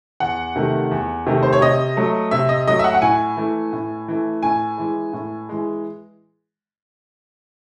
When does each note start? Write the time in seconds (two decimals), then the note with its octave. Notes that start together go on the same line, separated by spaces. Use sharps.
0.20 E2 F#5
0.56 C3 D#3 A3
0.91 E2
1.26 C3 D#3 A3
1.43 C5
1.53 C#5
1.61 C3 D#5
1.97 F#3 A3
2.31 C3 E5
2.49 D#5
2.67 F#3 A3 D#5
2.79 E5
2.84 F#5
2.95 F#5
3.02 A2 G#5
3.37 E3 A3
3.73 A2
4.08 E3 A3
4.43 A2 G#5
4.78 E3 G#3
5.13 A2
5.49 E3 G#3